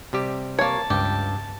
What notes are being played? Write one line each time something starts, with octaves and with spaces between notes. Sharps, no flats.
C3 G3 G4
A#3 C#5 A5
C#2 G2 G4